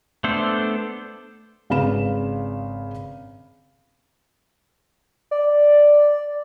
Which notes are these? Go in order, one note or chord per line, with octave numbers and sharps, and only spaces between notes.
A3 B3 D4 A4 C5
G#1 C#3 B4 F5 B5 E7
D5